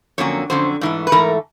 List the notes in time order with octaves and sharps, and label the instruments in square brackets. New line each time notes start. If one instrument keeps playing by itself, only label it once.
[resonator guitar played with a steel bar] F2 D3 F#3 A#3 C#4 C#5
F2 D3 F#3 C#4 C5
G#2 E3 A3
B4
G#2 E3 A3 A#4